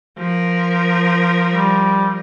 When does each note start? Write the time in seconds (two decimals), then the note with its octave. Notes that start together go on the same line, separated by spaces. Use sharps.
0.18 F3 A#4
1.51 G3